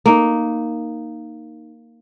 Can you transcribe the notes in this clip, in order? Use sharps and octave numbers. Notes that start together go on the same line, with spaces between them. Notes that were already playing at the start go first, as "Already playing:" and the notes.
A#3 D#4